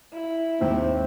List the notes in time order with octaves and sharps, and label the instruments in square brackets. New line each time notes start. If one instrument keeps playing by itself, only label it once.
[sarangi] E4
[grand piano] D#2 G#2 [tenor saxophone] C4